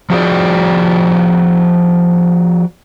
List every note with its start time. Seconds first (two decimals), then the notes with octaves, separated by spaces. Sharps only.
0.10 F3 F#4 G#4 D5